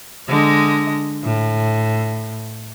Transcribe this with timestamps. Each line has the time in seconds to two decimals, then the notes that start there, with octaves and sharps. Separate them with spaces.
0.28 D3 G#3 D#5
1.24 A2